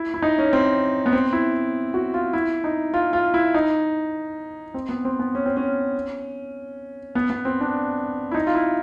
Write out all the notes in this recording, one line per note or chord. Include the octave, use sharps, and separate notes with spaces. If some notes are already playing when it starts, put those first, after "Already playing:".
Already playing: E4
E4
D#4
C#4
C4
B3
C4
E4
F#4
F4
E4
D#4
F4
F4
E4
D#4
C4
B3
C4
B3
C#4
C4
C#4
B3
B3
C4
D4
E4
D#4
F4
E4